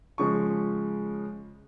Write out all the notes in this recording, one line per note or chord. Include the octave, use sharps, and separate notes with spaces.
C#3 F3 G#3 C#6